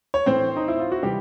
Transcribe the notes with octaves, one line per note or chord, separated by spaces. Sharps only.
C#5
A2 E3 C4 C5
D#4
E4
F4
F#4
C3 E3 G3 G4